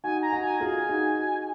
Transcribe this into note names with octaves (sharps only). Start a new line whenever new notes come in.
D#4 F#4 G#5
A#5
D#4 F#4
G#5
F4 G#4
D#4 F#4